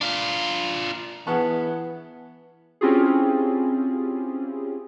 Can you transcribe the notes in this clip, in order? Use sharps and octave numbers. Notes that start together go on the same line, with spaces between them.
D4 F4
E3 B3 D4 G#4 B4 F#5 A5 C#6
C4 C#4 E4 F4 G4 G#4